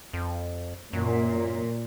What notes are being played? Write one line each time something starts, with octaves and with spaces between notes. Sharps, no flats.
F2
F#2 A#2